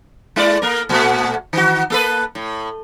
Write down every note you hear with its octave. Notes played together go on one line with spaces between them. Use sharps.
G#3 E4 D5
A#3 A#4
A#2 A3 F#4
D#3 F#4
A#3 A4 B4
A2